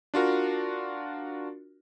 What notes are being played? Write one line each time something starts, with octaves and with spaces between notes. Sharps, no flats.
D4 F4 F#4 A#4